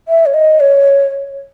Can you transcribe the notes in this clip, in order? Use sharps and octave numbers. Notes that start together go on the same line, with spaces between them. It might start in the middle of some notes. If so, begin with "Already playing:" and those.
E5
C#5
D#5
C#5